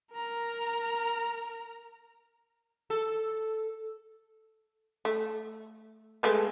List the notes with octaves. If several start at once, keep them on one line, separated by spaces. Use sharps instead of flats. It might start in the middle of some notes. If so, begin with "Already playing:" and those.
A#4 A#5
A4
A3
G#3 A3 B3